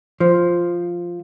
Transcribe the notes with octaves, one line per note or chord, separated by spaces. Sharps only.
F3